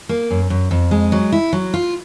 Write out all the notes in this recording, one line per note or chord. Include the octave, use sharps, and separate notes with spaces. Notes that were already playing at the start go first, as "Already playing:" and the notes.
A#3
F#2
F#2
F2
G#3
F#3
E4
F#3
F4